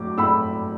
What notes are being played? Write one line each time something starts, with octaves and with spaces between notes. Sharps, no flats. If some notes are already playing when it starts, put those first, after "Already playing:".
Already playing: A2 F#3 D6
A2 B5 E6